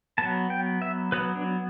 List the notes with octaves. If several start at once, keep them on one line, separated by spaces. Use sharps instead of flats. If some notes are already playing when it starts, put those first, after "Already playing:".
F#3 B3 A5
G5
E5
F#3 B3 B4
D4